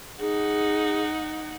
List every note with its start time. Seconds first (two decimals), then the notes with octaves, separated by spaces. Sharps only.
0.20 D#4 G#4 F#5